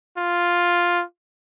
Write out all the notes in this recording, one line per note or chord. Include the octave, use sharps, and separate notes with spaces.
F4